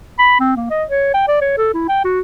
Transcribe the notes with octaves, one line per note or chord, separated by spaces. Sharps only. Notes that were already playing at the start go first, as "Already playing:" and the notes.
B5
C4
A#3
D#5
C#5
G5
D5
C#5
A4
E4
G5
F#4